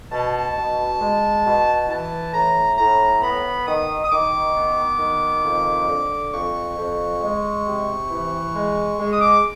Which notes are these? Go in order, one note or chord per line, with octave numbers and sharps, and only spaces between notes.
B2 A5
B2
G#3
B2
E3 A5
A2 A#5
A2 A#5
B3 B5
D#3 D#6
D#6
D#3 D6
B3
D#3
F2
D3
F2 C#6
F2
G#3
C3
E3
G#3
G#3
D#6
D6